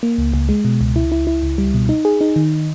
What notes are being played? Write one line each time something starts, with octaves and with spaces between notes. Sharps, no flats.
A#3
C#2
C#2
G#3
B2
C#2
E4
E4
E4
C#2
G3
B2
D#4
G#4
D#4
D#3